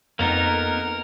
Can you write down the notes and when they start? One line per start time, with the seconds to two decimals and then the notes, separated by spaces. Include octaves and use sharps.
0.19 F2 A#3 B3 D#4 A#4